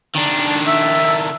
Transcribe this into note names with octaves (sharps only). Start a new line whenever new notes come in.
D#3 D4
E5